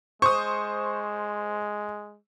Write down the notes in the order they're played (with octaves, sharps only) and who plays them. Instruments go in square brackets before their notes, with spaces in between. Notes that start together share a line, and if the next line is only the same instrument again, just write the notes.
[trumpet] G#3 [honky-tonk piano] C5 D#6 [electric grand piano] C#6